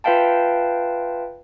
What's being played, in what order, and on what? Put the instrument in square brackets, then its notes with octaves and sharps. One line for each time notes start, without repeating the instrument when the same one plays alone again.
[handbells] F4 B4 E5 F5 G5 A5